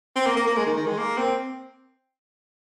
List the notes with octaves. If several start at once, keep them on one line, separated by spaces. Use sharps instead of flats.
C4
A#3
A#3
A#3
G#3
D#3
D#3
G#3
A#3
C4